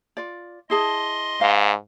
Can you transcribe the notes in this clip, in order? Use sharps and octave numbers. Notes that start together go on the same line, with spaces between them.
F4 D5
E4 G#4 D#5 A5 C6
G#2 F5